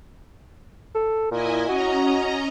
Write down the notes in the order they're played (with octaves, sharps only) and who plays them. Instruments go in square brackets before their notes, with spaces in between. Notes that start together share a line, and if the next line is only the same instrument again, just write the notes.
[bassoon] A4
[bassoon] A#2 [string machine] E4 D#5 G#5
[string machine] C#4 D#5 A#5 [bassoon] F#4